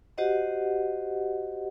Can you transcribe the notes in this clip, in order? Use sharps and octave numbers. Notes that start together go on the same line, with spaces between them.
F#4 G4 C5 D#5 F#5